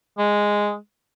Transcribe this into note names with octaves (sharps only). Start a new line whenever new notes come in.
G#3